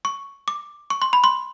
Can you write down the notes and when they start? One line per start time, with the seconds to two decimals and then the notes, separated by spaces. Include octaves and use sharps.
0.05 C#6
0.48 D6
0.90 C#6
1.02 C6
1.13 B5
1.24 C6